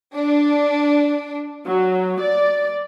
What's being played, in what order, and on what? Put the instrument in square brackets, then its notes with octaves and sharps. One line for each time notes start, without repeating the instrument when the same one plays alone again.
[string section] D4
F#3
D5